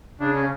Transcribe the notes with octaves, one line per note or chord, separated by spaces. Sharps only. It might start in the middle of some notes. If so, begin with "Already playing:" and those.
C#3 D4
C#4